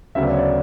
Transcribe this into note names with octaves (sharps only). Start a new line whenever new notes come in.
D2 C#3 F#3 B3 E5
D5
C#5
D5